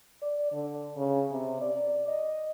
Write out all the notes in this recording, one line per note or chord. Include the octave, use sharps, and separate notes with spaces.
D5
D3
C#3
C3
D5
D#5